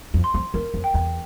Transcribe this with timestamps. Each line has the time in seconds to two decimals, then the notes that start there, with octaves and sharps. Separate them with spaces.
0.14 F2
0.24 C6
0.34 F2
0.54 E2 A#4
0.74 F2
0.84 G5
0.94 E2